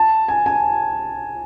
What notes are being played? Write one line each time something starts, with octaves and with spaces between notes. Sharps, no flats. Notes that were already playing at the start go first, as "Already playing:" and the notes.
Already playing: A5
G#5
G#5